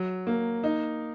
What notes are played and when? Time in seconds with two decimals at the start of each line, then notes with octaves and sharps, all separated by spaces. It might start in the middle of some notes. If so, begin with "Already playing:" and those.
Already playing: F#3
0.27 A#3
0.64 D#4